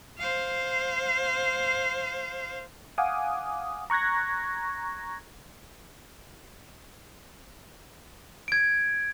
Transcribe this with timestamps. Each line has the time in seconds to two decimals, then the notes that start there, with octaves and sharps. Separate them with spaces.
0.19 C5 F5
2.98 F5 F#5 G#5 D6 D#6
3.90 A#5 C#6 F#6 G#6 A#6
8.48 G#6 D7